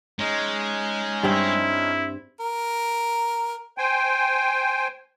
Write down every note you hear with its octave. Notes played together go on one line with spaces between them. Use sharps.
G#3 C#4 D#4 C#5
G2 C4 E4
A#4
C5 G5 G#5